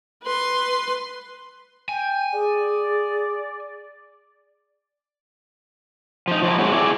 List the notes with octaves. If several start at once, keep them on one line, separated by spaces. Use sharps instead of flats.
B4 C6
G5 G#5
G#4 D5
F3 D#4
F3 F#3 E4
F#3 G#3 C4 F#4
D4 E4 G#4 A4 D5